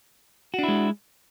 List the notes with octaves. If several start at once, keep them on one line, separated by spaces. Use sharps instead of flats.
G#3 D4 E4 F#4